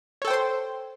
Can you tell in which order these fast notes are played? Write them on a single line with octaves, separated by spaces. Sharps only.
C#5 A4 G5 C5 C6